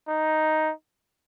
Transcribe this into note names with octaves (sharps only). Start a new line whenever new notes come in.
D#4